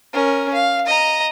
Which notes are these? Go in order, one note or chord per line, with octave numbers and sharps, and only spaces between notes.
C#4 A#4
F5
D#5 A#5